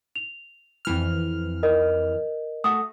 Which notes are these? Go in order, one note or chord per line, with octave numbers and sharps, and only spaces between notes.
F7
F2 E3 F6
A#4 D#5
A3 F#4 D#6